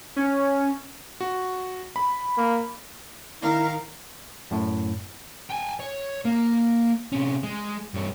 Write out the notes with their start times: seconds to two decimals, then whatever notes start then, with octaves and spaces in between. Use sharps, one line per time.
0.16 C#4
1.21 F#4
1.96 B5
2.37 A#3
3.42 D#3 E4 A#4 F5
4.51 F#2 A2
5.50 G5 G#5
5.80 C#5
6.25 A#3
7.12 C3 C#4
7.43 G#3
7.94 G2 C#5